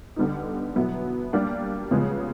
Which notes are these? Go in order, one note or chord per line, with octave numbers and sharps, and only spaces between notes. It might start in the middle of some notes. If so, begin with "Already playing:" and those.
D3 G3 B3 D#4
B2 F#3 B3 E4
G3 A#3 D4 G4
C#3 F3 G#3 B3